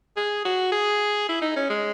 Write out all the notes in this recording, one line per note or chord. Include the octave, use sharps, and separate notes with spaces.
G#4
F#4
G#4
E4
D#4
C#4
G#3